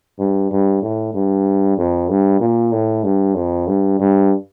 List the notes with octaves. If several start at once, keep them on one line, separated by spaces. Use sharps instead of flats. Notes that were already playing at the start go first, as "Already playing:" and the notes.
G2
G2
A2
G2
F2
G2
A#2
A2
G2
F2
G2
G2